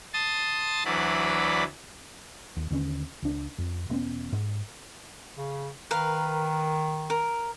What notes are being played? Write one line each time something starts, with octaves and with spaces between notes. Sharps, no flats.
A5 C6 D#6 A6
D2 E3 F#3 D5 B5
D#2
D#2 D3 E3 C#4
C#2 D4
F2
E1 B3 C#4
G#2
C#3
D#3 A#4 B4 F5
A#4